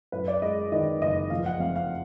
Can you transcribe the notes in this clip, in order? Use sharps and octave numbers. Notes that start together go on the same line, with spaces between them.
F#2 B4
D5
G#3 D#5
D#3 D#5
F#1 D#5
F3 F5
F#5
F2 F5
F5